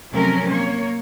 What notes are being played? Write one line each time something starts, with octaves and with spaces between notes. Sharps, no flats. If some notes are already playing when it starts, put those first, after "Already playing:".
C3 F3 F#3 A3 C#4 A#4
A#3 C#5